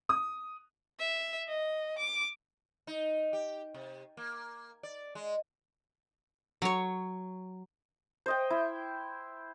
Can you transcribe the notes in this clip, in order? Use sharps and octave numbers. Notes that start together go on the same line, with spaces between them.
D#6
E5
D#5
D6
D#4
G4
C3
A#3
D5
G#3
F#3 C#5
C5 D#5 G5
E4